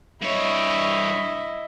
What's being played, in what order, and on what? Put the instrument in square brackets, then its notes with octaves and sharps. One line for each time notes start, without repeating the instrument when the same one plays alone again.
[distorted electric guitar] G2 C#5 [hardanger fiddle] E4 D#5